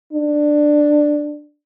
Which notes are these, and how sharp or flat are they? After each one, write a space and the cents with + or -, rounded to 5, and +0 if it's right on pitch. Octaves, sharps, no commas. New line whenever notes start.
D4 +10